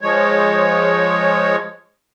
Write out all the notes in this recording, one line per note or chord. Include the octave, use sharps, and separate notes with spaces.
F3 G#3 C#5